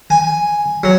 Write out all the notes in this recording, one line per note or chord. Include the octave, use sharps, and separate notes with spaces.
G#5
F#3